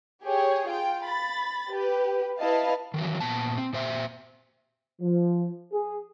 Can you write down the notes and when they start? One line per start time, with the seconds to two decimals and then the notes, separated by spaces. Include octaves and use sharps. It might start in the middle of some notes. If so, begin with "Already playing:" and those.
0.22 G4 G#4 C#5
0.67 F4 G5
1.03 B5 A6
1.69 G4 B4
2.39 E4 B4 D#5 F5 A5
2.94 D#3 E3 F#3
3.20 A#2 B3 A5
3.58 C4
3.73 A#2 C5 E5
5.02 F3
5.73 G#4